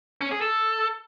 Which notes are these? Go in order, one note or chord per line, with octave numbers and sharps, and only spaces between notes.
C#4
G#4
A4